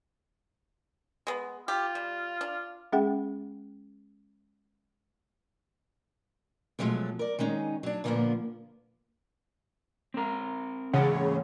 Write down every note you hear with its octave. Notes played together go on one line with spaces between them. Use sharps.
G#3 B3
F4 G4
G3
D4
G#3 C#4 G#4 E5 F#5 G5
B2 F3 F#3 G#3 A3
A#4 D5
D#3 G#3 C#4 D#4
F#3 D4
A#2 D3 F3 G3 A#3 B3
C4 A#4
G#2 C#3 E3 F#5